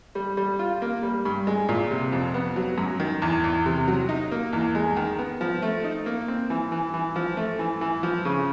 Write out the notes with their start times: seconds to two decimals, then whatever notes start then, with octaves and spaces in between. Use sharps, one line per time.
0.15 G3
0.37 G3
0.59 F4
0.82 A#3
1.03 G3
1.25 G2
1.47 G#3
1.69 A#2
1.91 C3
2.12 F2
2.34 B3
2.56 F#3
2.78 F#2
3.00 D#3
3.22 E2
3.44 E2
3.66 C3
3.88 F#3
4.09 D#4
4.31 A#3
4.53 E2
4.75 G#3
4.96 D#3
5.18 B3
5.41 F3
5.62 A3
5.84 D#4
6.06 A#3
6.28 C4
6.50 E3
6.72 E3
6.94 E3
7.16 F3
7.37 A3
7.59 E3
7.81 E3
8.03 F3
8.25 C#3